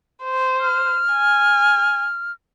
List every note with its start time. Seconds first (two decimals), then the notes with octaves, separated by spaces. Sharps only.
0.24 C5
0.61 F6
1.12 G#5